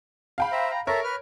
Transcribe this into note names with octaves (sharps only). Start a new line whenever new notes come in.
F5 G5 B5
C5 E5 A#5
A#5
A4 A#4 C#5 E5 A#5
B4 F6